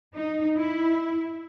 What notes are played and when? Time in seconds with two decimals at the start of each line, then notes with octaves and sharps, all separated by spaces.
0.14 D#4
0.57 E4